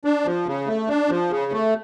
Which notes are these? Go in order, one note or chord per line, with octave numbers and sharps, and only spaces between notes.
D4
F3
C#3
A3
D4
F3
C#3
A3